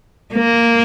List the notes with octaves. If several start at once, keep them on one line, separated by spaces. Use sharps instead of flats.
A#3